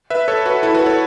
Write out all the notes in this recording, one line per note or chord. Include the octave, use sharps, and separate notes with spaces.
B4 E5
A4 C#5
F#4 B4
E4 A4
F#4 B4
A4 C#5